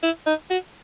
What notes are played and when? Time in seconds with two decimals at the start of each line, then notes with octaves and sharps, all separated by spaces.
0.03 E4
0.27 D#4
0.50 F#4